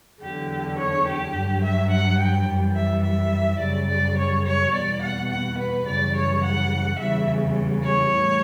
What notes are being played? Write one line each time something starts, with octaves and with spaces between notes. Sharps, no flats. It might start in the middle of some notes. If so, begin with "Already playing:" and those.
E2 D3 F#3 G4
C#5
G4
G2 F#3
E5
F#5
G5
F#2 E3 G3
E5
E5
F#2 C#3 G3 D5
D5
C#5
C#5
E2 B2 G3 D5
F#5
F#5
B4
F#2 C#3 E3 G3 D5
C#5
F#5
E2 C#3 E3 G3 E5
C#5
A2 E3 G3